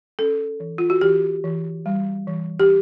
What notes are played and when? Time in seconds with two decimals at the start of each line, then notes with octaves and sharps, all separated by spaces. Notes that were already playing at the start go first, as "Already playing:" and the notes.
0.19 C#4 A4
0.60 E3
0.78 F4
0.90 F#4
1.01 E3 G4
1.44 E3
1.86 G3
2.28 E3
2.60 G4